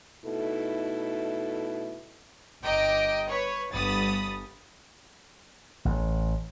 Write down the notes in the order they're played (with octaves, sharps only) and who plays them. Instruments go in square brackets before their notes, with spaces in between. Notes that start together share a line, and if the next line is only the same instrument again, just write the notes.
[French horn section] B2 A3 D#4 E4 A4
[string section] G1 D#5 G5 A#5 D6
B4 C#5
G1 G2 B3 B5 D#6 A6
[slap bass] A1